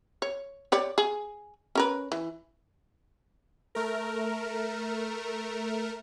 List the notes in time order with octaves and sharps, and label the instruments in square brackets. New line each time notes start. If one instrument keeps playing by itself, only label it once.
[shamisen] C#5
G4 C#5 D5
G#4
C#4 A#4 B4
E3
[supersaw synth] A3 A#4